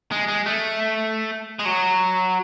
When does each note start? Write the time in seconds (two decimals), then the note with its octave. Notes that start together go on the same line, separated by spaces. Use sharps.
0.12 G#3
0.28 G#3
0.46 A3
1.59 G#3
1.65 F#3